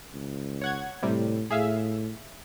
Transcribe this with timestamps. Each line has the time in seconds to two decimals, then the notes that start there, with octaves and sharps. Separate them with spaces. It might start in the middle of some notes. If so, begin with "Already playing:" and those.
0.12 C#2
0.61 C#5 F#5 G#6
1.03 A2 C3 G3
1.51 A2 G#4 E5 F5